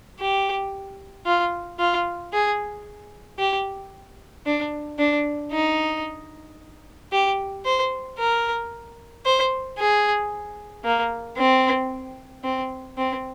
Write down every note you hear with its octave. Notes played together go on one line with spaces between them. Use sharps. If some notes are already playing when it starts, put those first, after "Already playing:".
G4
F4
F4
G#4
G4
D4
D4
D#4
G4
C5
A#4
C5
G#4
A#3
C4
C4
C4